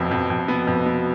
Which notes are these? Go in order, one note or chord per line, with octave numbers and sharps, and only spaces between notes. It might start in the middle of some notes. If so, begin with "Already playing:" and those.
Already playing: F1 F2 B2
F2
F2
B2 B3
F2
B3